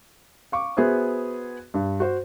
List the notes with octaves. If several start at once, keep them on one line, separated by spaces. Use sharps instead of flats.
F5 C#6 D6
B3 F#4 G#4 C5 E5
G2
F#4 C5